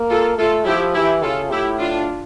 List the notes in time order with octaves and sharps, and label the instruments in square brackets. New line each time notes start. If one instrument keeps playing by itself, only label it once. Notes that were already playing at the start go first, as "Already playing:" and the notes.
Already playing: [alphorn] A#3
[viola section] F4 A4
[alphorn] A3 [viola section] F4 A4
[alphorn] F3 [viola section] E4 G4
[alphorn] E3 [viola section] E4 G4
[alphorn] C#3 [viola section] F4 A4
[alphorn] A2 [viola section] E4 G4
[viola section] D4 F4